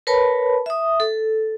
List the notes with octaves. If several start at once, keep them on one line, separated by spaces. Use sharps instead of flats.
A#4 B4 C#5 A5 B5
E5 D#6
A4